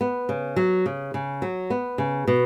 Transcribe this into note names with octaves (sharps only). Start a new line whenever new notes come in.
B3
C#3
F#3
C#3
C#3
F#3
B3
C#3
B2